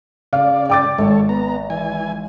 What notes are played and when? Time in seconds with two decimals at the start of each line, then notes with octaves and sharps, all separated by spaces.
0.33 C#3 D5 F5
0.69 G5 D6 A6
0.98 G#1 A4 C#5
1.29 B3 A#5
1.70 E3 G#5